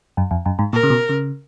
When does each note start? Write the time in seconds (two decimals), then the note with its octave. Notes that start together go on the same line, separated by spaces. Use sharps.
0.17 F#2
0.31 F2
0.46 F#2
0.59 G#2
0.73 A#2 A#4
0.83 C#3
0.90 B2
1.09 C#3